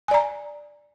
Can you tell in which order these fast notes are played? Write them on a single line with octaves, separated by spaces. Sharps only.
G#5 D5 A#5